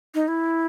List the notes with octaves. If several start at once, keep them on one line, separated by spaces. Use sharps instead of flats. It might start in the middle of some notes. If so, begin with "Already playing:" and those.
D#4
E4